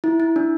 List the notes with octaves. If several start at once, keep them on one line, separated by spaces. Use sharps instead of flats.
E4
E4
D4